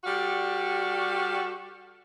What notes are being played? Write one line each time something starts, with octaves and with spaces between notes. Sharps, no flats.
G3 F#4 A4 D5 F5